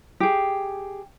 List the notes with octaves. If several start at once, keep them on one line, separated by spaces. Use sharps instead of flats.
G4 G#4